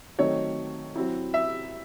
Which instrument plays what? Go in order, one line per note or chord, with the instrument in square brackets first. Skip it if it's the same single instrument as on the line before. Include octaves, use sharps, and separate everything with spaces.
[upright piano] D#3 F#3 A3 C4 D#4 C#5
F#3 C4 E4
E5